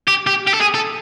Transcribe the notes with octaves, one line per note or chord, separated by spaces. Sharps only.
G4
G4
G4
A4
G#4
A4